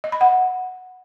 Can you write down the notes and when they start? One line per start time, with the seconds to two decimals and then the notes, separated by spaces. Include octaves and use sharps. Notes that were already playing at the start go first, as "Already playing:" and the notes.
0.04 D#5
0.12 B5
0.21 F#5